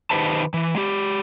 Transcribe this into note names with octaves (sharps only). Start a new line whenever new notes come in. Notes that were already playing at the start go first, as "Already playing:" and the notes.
D#3 D#4 G4 B4 C5 A5
E3
G#3 G4